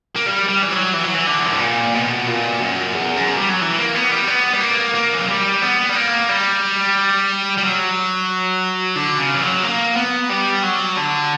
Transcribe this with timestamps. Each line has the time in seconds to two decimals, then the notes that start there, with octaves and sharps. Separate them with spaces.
0.16 A#3
0.26 G3
0.48 G3
0.62 E3
0.71 F#3
0.93 E3
1.04 F#3
1.15 E3
1.27 D3
1.38 E2
1.45 F#2
1.53 G2
1.60 A#2
1.94 B2
2.27 A#2
2.60 F#2
2.94 E2
3.17 F#2
3.37 G3
3.49 F#3
3.61 E3
3.78 A#3
3.95 B3
4.11 G3
4.27 B3
4.53 G3
4.61 A#3
4.95 A#3
5.14 E3
5.21 F#3
5.28 G3
5.62 B3
5.89 G3
5.95 A#3
6.29 G3
7.57 G3
7.63 F#3
8.96 D3
9.18 C#3
9.34 E3
9.41 F#3
9.63 A#3
9.96 B3
10.30 G3
10.63 F#3
10.97 D3